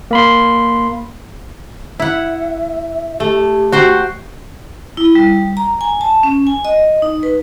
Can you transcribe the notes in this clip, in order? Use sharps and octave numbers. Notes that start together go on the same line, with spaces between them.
A#3 B5 C6
E4 E5 F#5
A3 G4
F#4 C5 G5
E4
G3
A#5
G#5
A5
C#4
G#5
D#5
D#4
B4